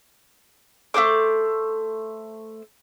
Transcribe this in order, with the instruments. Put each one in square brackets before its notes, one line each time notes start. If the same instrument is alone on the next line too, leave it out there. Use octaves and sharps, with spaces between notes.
[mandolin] A3 D4 C5 D6